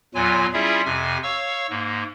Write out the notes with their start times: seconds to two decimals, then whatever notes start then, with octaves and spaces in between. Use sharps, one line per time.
0.15 E2 A#2 F#3 F4 G#5
0.53 G3 C#4 E4 F4 G#4 E5
0.85 F2 C3 G#5
1.23 C#5 F5 C#6 E6
1.70 G#2 A#3